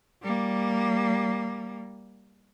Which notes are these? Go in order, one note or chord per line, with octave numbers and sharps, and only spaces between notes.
G3 A#3